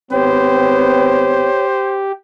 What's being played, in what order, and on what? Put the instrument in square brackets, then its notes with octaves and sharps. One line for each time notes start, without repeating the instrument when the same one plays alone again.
[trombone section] G#1 B3 C4 [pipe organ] G4 [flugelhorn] C5 [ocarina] C#5